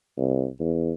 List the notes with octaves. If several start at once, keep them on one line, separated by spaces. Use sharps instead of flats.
C2
E2